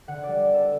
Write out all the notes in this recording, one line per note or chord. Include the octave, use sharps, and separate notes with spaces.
D3 F#5
D5
G3
B3
A4